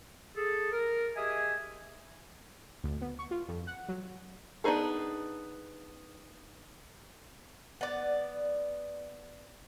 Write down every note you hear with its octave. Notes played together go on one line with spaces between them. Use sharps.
G#4 A4
A#4
G4 G#4 D#5 E5 G#5
D2
B3
C#6
F4
F2
F#5
F#3
B3 D4 D#4 G#4 A4
B3 D5